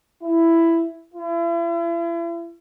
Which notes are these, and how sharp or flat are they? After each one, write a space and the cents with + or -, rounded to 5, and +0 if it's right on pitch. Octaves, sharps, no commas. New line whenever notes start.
E4 +10
E4 +40